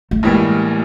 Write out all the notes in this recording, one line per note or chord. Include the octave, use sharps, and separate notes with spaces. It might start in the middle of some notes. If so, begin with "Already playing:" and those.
A3
A1 A2 E3 G3 G#3 A#3